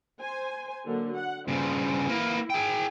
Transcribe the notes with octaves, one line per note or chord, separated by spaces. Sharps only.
C5 G#5
D3 F#3 A#3
F#5
G2 C#3 C5
A#3 E4 B4
G#4 G5